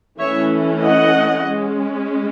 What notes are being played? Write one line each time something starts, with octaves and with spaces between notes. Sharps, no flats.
E3 A3 C#4 C#5 E5
D#5 F#5
G#3 C#4